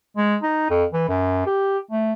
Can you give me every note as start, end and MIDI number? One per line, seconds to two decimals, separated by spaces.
0.17 0.37 56
0.42 0.66 63
0.70 0.84 41
0.93 1.04 52
1.09 1.43 42
1.46 1.78 67
1.91 2.13 57